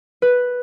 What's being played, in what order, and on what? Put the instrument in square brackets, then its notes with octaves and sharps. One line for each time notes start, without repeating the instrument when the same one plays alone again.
[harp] B4